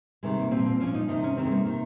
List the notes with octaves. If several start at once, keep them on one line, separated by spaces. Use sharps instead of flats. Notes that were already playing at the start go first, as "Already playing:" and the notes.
C3 D#3 G#3
A#3
A#2 C4
F3
C4
A#2 F3 C#4
D#4
C3 D#3 D#4
C#4
C3 D#3 C4
G#3
A#3
C3 D#3